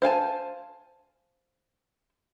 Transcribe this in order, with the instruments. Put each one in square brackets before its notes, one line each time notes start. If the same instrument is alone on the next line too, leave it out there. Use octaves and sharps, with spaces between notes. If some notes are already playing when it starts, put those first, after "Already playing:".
[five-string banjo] C5 F5 G#5 A5